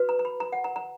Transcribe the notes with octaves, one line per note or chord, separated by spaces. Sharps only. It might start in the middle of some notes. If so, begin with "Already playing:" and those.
Already playing: F#4 B4
A#5
A#5
B5
A#5
F#5
A#5
A#5